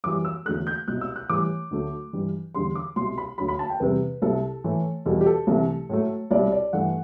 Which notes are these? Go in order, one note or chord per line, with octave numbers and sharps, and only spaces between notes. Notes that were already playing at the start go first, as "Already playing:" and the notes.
F#2 E3 G3 D6
E6
E2 D3 F#3 A3 F#6
G6
C2 B2 F#3 F#6
E6
F#6
A2 E3 G3 D6
D2 D3 F#3 A3
G2 E3 G3
E2 D3 G3 C6
D6
C2 B2 F#3 C6
B5
D2 D3 F#3 B5
B5
A5
G5
E2 C3 G3 B4
C2 C3 G3 A4
A2 E3 A3
E2 B2 G3 A4
G4
A4
C2 C3 E3 A3
A2 F#3 A3
C2 B2 G3 D5
D5
G2 E3 A3 F#5